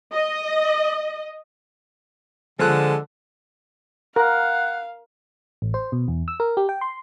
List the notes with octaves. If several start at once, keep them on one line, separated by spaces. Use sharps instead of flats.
D#5
D3 F3 G#3 A4 F#6
A#4 F5 F#5
A1
C5
B2
E2
E6
A#4
G4
G5
C6